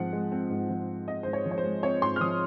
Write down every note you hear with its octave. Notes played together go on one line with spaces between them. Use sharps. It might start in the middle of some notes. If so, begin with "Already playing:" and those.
Already playing: G#2 F3 C4 F#5
G#3
C4
G#2
F3
G#3
C4 D#5
G#2 C5
C#5
F3
C#5
C5
G#3
C4 C#5
G#2 C6
F6
F3 D#6